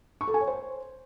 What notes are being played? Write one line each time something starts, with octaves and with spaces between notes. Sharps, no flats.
C#6
A4
G#5
C#5
C5